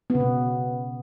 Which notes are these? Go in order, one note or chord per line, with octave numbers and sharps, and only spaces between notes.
B3
C#3
B2